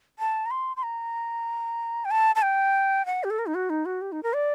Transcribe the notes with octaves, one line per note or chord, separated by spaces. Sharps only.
A5
A#5
C6
C6
A#5
G5
A5
A5
G5
F#5
G4
A4
A#4
D#4
F#4
D#4
F#4
G4
D#4
A#4
D5